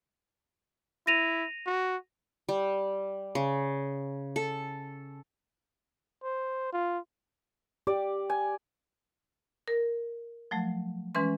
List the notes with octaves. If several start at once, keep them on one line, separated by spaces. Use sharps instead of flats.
E4 A#6 D#7 F7
F#4
G3
C#3
A4
C5
F4
G4 D5
G#5
A#4
F3 F#3 A3
E3 G#3 C#4 B4 C6